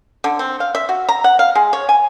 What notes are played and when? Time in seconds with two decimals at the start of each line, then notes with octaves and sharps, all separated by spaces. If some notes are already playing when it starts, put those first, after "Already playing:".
0.24 D3
0.39 C4
0.60 F5
0.75 E5
0.89 F#4
1.09 A#5
1.24 F#5
1.39 F5
1.55 G#3
1.73 C#5
1.89 G#5